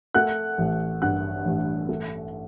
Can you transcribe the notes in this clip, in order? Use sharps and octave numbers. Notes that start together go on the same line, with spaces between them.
A3 F#5 F#6
A1
G2 F#5 F#6
A1
A3